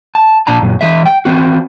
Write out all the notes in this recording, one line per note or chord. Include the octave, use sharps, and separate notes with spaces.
A5
A#2 D4 A5 A#5
F#2 A#2
E3 G#3 E5
G5
E3 C4 F#4